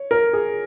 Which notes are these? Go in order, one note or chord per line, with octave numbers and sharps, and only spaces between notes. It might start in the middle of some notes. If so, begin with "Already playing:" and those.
Already playing: C#5
A#4
G#4